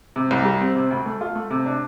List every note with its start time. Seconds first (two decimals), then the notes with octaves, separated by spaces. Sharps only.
0.16 C3
0.31 C2
0.45 G3
0.61 C4
0.75 C3
0.91 D2
1.06 A3
1.21 F4
1.35 A3
1.51 C3
1.66 D4